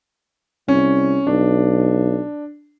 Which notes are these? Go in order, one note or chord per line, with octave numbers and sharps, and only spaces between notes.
C2 C#4
B1 D4